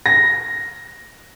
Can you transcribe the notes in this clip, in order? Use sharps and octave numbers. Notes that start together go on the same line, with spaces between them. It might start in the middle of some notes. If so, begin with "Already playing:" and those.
A#6